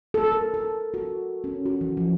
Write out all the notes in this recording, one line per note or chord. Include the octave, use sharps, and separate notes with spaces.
A4
A#4
A4
F#4
C#4
F#4
E3
F3